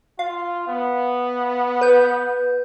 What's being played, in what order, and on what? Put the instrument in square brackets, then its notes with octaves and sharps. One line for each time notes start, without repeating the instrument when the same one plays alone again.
[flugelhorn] F4 [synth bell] F5
[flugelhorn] B3
[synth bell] B4 G6